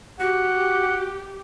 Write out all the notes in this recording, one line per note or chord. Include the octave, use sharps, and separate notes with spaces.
F#4 G4 F#5